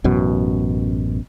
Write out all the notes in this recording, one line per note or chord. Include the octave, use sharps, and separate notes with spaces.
A1 F#2 B2